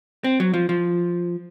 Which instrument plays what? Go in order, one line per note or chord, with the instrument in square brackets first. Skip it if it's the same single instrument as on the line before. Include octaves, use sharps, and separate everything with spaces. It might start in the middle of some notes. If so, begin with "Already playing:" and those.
[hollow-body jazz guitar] C4
F#3
F3
F3